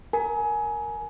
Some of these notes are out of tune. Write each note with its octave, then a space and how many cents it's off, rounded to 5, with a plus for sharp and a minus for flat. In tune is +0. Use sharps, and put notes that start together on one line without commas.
A#4 +0 G#5 +20